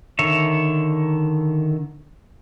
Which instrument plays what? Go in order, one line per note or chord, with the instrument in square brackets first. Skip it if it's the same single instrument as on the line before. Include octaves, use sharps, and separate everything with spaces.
[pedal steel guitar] D3 D#3 C#5 E5